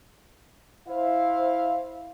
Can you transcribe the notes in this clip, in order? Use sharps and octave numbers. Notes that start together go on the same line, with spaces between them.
E4 C5 E5 F5